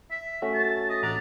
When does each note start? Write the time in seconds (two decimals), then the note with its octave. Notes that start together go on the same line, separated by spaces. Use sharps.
0.11 E5
0.42 A3 C#4 F#4
0.54 A5
0.90 D#5
1.03 A1 D4 A#5 A6